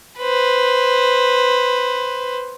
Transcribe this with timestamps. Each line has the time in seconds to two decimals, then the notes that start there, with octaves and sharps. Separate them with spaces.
0.19 B4 C5